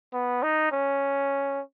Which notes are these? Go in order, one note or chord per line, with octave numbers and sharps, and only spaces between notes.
B3
D#4
C#4